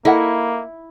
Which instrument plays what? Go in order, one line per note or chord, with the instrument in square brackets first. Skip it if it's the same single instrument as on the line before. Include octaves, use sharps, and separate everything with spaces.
[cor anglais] A#3 [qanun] E4 [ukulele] A4 D#5 F#5